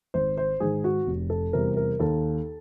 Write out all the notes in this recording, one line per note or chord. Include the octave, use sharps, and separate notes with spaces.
G#1 C5
C5
G#2 D#3 G#4
F#4
F1
A4
E2 C3 E3 G3 A#4
A#4
D#2 A4